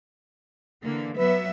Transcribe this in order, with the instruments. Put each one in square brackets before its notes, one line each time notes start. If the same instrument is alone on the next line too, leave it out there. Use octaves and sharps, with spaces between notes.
[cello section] D3 E3 A#3
[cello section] F#3 B3 E5 [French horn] B4